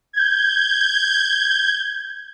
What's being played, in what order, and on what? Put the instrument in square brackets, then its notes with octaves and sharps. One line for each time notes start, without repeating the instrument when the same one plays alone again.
[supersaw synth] G6 G#6